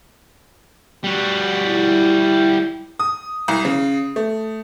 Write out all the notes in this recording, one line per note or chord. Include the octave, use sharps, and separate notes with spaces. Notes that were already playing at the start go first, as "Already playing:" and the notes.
G3 F#4
E4
D#6
C2
C#3
A3